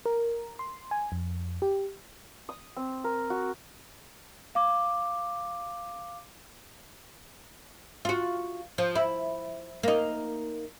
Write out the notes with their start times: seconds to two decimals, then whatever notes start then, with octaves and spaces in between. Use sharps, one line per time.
0.06 A#4
0.59 C6
0.91 G#5
1.12 F2
1.62 G4
2.49 D#6
2.76 C4
3.04 A#4
3.30 F#4
4.55 F5 D6
8.05 F4 F#4
8.78 F3
8.96 E4
9.83 A#3 D#4